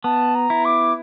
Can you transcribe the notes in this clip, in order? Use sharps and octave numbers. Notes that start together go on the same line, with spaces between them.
B3 A5
A#5
E4
D6